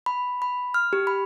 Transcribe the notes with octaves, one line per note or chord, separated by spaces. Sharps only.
B5
B5
F6
G4
B5